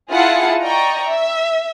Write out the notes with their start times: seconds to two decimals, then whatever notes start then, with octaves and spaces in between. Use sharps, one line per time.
0.10 E4 F4 G#4 F#5 A5
0.61 D5 D#5 G5 A#5 C#6
1.08 E5